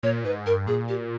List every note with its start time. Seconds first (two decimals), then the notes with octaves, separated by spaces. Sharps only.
0.03 A#2 C#5
0.24 G#2 B4
0.46 G2 A#4
0.67 A#2 G#4
0.89 G4